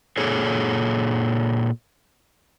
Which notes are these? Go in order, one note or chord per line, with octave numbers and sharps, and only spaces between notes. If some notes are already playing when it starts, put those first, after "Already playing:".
A#2 G#4 A4 C#5